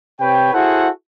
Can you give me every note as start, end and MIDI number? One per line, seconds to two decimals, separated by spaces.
0.21 0.52 48
0.21 0.52 71
0.21 0.52 73
0.21 0.52 79
0.54 0.89 64
0.54 0.89 66
0.54 0.89 68
0.54 0.89 69
0.54 0.89 72
0.54 0.89 78